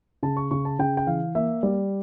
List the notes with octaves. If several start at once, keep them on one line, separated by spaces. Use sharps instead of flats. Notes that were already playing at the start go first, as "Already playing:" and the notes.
C#3 A5
C#6
C#3 C#6
A5
C#3 G5
G5
E3 F5
A#3 E5
G3 D5